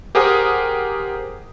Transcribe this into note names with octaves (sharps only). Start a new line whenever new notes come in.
G4 G#4 A#4 C5 F#5 D#6